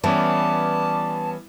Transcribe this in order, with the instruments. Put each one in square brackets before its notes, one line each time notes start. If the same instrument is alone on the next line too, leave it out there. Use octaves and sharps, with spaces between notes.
[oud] E3 [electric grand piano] G3 B3 C#4 [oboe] D5 [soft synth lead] A5